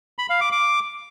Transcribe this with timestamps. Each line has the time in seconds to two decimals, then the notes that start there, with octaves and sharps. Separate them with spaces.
0.19 B5
0.30 F5
0.41 D6
0.52 D6